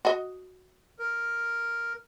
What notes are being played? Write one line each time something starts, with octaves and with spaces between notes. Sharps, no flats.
F#4 D#5
A#4